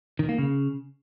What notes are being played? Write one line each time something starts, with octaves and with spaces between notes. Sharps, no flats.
D#3
A#3
C#3